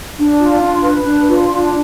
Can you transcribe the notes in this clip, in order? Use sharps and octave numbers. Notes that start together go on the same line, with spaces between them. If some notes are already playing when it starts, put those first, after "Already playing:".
D4
F4
D4
B4
D4
F4
D4